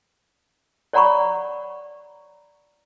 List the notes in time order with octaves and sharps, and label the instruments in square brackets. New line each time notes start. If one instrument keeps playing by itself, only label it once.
[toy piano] C#5 D5 F#5 A#5 B5 C#6